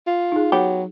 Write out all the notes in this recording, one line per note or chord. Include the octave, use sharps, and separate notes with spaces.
F4
D#4 G#4
F#3 B3 G4